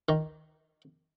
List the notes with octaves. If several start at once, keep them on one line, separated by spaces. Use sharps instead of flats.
D#3